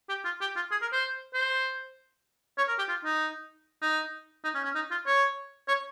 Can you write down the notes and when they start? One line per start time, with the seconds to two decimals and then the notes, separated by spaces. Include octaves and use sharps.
0.09 G4
0.24 F4
0.41 G4
0.56 F4
0.71 G#4
0.82 A#4
0.93 C5
1.34 C5
2.58 C#5
2.68 A#4
2.78 G4
2.89 F4
3.05 D#4
3.82 D#4
4.44 D#4
4.55 C#4
4.65 C#4
4.75 D#4
4.91 F4
5.06 C#5
5.68 C#5